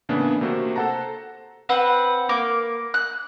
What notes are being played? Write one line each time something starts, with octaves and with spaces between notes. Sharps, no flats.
A2 C#3 E3 A#3 B3 D4
C3 A3 A#3 F#4 C5
A4 C5 F#5 A5 A#5
C4 B4 F#5
A#3 D6
F#6